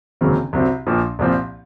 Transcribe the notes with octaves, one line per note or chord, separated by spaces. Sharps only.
F1 D#2 C#3 F#3 C4
C2 C3 F#3 C4
A#1 A#2 F3
C2 A#2 F3 C4